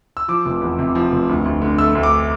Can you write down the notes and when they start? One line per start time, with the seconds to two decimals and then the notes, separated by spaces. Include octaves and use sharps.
0.17 E6
0.28 F3 D6
0.46 F1
0.62 E2
0.79 C3
0.95 F3
1.12 F1
1.29 D2
1.45 D2
1.62 D3
1.78 A3 E6
1.95 D2
2.03 D6